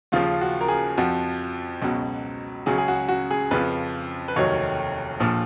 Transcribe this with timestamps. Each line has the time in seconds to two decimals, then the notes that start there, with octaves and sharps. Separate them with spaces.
0.12 D#2 C#3 F3 F4
0.41 F#4
0.61 A#4
0.68 G#4
0.98 F2 F3 F#4
1.82 C#2 B2 F#3
2.66 C#2 C#3 F#3 G#4
2.78 G#4
2.88 F#4
3.09 F#4
3.31 G#4
3.51 F2 C#3 F3 B4
4.28 B4
4.36 F1 D#2 D#3 F#3 C#5
5.20 A#1 A#2 F3